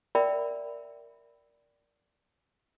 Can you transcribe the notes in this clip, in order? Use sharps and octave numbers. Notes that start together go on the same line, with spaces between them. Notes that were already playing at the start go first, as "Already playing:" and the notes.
A#4 D5 E5 G5 B5